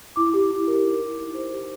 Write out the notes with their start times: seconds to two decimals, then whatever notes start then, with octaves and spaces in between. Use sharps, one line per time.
0.16 E4 D6
0.33 G4
0.51 E4
0.68 A#4
0.84 D#4
1.00 G4
1.18 D#4
1.34 C5
1.51 G4